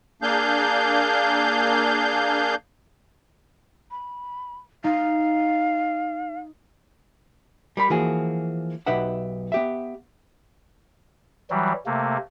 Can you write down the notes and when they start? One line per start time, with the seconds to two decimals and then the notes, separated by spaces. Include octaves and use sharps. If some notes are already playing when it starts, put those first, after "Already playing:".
0.22 A#3 D4 G#4 F5 G6
3.91 B5
4.84 D#4 F5
7.77 G3 A#4 B5
7.90 E3 F3 A#3 F#4 G#4
8.86 B1 D#4 G4 B4 E5 F#5
9.52 B3 G4 E5
11.50 E3 F#3 G3
11.86 C3 A3 A#3